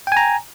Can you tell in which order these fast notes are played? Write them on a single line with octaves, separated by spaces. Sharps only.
G5 G#5 A#5